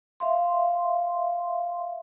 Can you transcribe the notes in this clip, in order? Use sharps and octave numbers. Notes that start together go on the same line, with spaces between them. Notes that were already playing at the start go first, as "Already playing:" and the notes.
E5 F5 C6